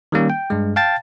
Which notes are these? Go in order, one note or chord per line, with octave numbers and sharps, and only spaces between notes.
D#3 G3 A#3 C#4
G5
G2 G#3
F5 G5 A5 A6